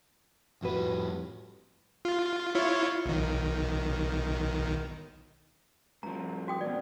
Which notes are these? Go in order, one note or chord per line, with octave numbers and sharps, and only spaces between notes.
F2 A2 G3 F#4 B4
F4
E4 F4 C#5
B1 D#3
G2 F3 A#5
F#4 G5 D#6
D#2 B2 D5